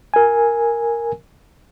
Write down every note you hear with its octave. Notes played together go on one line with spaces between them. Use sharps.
A#4 G#5